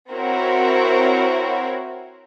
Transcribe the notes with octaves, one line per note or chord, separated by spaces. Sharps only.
C4 E4 F#4 A#4 C5 C#5